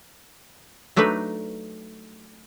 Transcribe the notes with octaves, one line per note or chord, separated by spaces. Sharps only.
F#3 A3 D4 D#4 B4